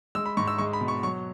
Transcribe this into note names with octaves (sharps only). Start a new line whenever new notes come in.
G#3 E6
B5
G#2 C#6
E6
G#3 C#6
B5
B2
C#6
F#3 C#6